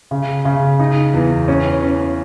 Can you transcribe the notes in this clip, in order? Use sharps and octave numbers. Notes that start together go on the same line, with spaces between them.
C#3
C#3
D#4
E2
C#4
C#4